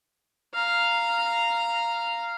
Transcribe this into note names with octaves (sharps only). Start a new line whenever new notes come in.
F5 A#5